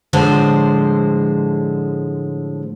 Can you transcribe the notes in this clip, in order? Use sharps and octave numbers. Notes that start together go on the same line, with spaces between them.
A2 D3 F3 G#3 C5